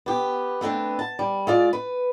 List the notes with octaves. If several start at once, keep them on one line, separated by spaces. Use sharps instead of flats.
B3 G4
A3 B3 C4 D4
A5
G3
G#3 F4 D5
B4